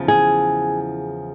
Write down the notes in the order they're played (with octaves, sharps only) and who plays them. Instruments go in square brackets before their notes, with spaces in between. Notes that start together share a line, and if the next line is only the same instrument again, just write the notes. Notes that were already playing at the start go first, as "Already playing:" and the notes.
Already playing: [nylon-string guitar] E2 C#3 F3
G#4